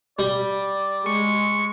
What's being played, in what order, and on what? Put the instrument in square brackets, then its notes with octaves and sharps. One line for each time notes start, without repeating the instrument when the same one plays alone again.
[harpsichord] G3 [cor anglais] D5
[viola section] G#3 [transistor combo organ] C#6